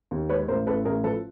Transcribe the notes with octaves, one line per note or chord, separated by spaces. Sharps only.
D#2
G#3 B4 C#5
A1 A#4 C5
A1 A4 B4
A1 G#4 A#4
F3 A4 B4